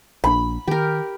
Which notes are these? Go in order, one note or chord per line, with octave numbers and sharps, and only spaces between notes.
A#1 D4 B5
D#3 G4 A#4